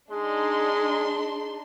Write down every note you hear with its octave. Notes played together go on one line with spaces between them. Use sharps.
G#3 D4 D#4 G#4 C6